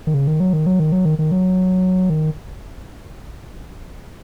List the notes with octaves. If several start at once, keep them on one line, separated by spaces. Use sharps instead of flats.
D#3
C#3
D#3
F#3
D#3
F#3
D#3
F#3
D#3
D#3
F#3
D#3